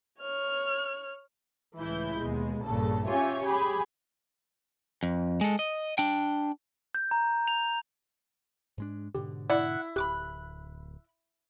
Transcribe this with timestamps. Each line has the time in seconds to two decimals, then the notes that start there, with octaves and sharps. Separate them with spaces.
0.21 C#5 F6
1.77 C#2 A2 E3 E4 G6
2.18 D#2 B2 G#3
2.65 A#1 G2 A#2 C#3 A4
3.08 C#4 F4 G4 C#5 E5 G#5
3.43 G4 G#4 G#5 B5
5.03 F2
5.41 G#3 A4
5.59 D#5
5.98 D4 G5
6.95 G6
7.11 A#5
7.48 F7
8.78 G#2 G#3 D4
9.15 G#2 B2 D3 G4
9.50 E4 D5 F#5
9.96 D1 G4 B5 D6 F#6